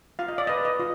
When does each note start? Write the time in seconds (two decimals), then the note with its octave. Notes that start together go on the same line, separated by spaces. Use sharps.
0.19 F4 F5
0.28 D#5
0.38 D5
0.47 B4 D#5
0.65 D#5
0.80 F4